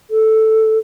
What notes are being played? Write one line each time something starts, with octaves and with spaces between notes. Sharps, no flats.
A4